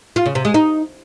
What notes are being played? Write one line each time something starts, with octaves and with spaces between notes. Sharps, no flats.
F4
C#3
C3
G#3
D#4